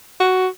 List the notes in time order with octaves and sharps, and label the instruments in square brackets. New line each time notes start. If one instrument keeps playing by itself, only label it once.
[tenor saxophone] F#4